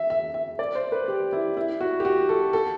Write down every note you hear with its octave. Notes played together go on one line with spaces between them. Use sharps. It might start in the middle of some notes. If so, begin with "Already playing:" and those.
Already playing: E5
E5
E5
D5
C5
B4
G4
E4
E4
F#4
G4
F#4
A4
A4